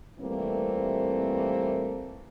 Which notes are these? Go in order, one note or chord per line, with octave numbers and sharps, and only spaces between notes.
A#2 E3 G3 A3 A#3 C4